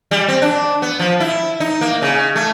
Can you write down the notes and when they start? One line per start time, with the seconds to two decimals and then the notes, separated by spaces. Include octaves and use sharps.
0.11 G3
0.28 C4
0.42 D4
0.82 B3
0.99 F3
1.20 E4
1.60 D#4
1.81 A#3
2.02 C#3
2.36 A3